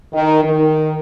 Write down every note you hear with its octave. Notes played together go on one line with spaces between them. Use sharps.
D#3
D#3